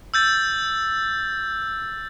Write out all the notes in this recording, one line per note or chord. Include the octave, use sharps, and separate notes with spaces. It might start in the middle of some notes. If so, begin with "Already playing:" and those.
E6 G6 A6